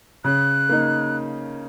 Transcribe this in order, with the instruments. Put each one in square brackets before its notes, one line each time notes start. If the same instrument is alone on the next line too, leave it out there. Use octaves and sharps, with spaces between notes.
[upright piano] C#3 [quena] F#6
[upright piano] A#3 D#4